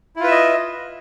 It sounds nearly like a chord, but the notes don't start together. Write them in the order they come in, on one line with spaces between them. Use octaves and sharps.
E4 F4 B4 E5 D#5